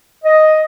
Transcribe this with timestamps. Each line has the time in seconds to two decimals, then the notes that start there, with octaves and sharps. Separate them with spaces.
0.24 D#5